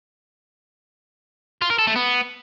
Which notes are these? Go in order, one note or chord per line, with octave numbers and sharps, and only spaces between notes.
F4
A#4
A4
A3
B3